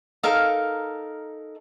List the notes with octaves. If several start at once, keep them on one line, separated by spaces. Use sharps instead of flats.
D#4 A4 A#4 F5